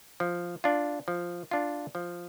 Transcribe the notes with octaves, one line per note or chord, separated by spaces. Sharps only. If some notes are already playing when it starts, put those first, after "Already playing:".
F3
D4 F4
F3
D4 F4
F3